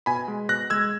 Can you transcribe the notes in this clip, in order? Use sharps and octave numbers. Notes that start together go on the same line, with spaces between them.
B2 G#5 B5
G#3
B2 F#6 A#6
G#3 E6 G#6